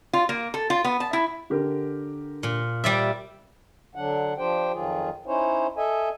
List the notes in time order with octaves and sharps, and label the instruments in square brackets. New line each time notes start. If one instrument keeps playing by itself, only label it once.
[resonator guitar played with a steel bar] F4
A#3
A4
F4
B3
A5
E4
[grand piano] D3 G4 A#4
[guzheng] A#2
G3 D5 E5
[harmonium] D3 F#3 D4 F#5
F3 D4 G4 C5 G5
F2 D#3 F#3 F4 G#4
C#4 D#4 E4 C5 C#5
A4 D#5 E5 G#5